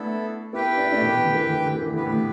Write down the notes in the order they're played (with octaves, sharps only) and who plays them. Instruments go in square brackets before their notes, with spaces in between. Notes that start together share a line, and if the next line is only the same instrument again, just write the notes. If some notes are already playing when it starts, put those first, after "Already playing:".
Already playing: [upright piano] A3 D4 [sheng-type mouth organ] B3 E4 A4
[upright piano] B3 E4 [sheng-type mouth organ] G4 B4 G5
[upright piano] D4
E4
A3 D4
B2 E3
D3
E3
D3
E3
D3
E3
D3
[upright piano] E3 [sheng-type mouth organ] B3 G4 B4
[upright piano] A2 D3